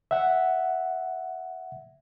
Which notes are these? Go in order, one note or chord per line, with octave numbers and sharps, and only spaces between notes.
E5 F#5